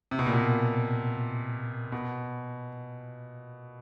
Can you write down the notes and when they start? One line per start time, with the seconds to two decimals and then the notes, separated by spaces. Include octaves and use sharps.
0.11 C3
0.19 B2
0.26 A#2
0.33 B2
1.92 B2